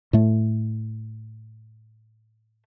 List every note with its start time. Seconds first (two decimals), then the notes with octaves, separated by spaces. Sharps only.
0.13 A2 A3